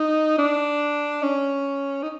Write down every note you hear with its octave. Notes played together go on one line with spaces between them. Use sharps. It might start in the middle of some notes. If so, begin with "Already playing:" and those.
Already playing: D#4
D4
C#4
D#4